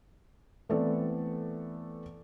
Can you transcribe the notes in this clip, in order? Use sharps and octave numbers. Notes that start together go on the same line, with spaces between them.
E3 A3 B3 C4 A4 D5